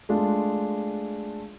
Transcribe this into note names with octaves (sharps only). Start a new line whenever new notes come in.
G#3 A3 D4 F4